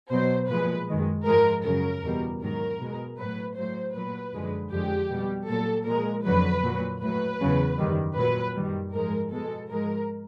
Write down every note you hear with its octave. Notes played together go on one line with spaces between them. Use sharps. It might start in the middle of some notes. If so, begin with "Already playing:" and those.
B2 F#3 C5
A#2 F3 G#3 B4
F#2 D#3 G#3
G#2 F3 G#3 A#4
F#2 C#3 F#3 A#4
E2 B2 G3
G#2 D#3 F#3 A#4
B2 G#3
A2 F#3 B4
A2 F#3 C5
A#2 F#3 B4
F#2 D3 F3 G#3
F2 D3 F3 G#3 G4
B2 G3
A#2 F#3 A4
A#2 F3 G#3 A#4
F2 D3 F#3 B4
A#2 F#3
A2 F#3 B4
E2 C#3 F#3
F#2 D#3 G3
A#2 F#3 B4
F#2 D#3 G3
G#2 F3 G#3 A#4
B2 G#3 A4
G#2 F3 G#3 A#4